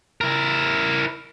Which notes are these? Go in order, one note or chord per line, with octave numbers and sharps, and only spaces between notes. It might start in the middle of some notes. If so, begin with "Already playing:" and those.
E4 A#4